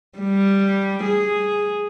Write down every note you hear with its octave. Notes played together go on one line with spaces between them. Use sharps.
G3
G#4